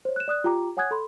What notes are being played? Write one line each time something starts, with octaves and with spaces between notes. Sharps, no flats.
C5 C#5
F#6 E7
D5 D#6 F#6
F4 G4 G5 A#5 D6
C#5 F#5 G#5 D#6 F#6 G#6
A4 B5 C6